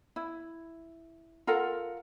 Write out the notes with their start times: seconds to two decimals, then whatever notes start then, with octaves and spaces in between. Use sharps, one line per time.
0.16 E4
1.47 F4 A4 A#4 F#5